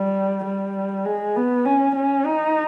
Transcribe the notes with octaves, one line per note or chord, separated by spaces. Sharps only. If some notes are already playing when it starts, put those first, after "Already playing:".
Already playing: G3
G3
G#3
B3
C#4
C#4
D#4